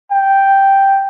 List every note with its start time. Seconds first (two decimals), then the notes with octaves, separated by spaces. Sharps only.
0.11 G5